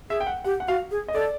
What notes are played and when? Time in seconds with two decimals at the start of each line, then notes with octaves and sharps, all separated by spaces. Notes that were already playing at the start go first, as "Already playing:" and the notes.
0.10 G#4 E5
0.20 G5
0.27 F#5
0.44 G4 F#5
0.60 F#5
0.68 F#4 F5
0.91 G#4
1.08 D#5
1.14 A4 D5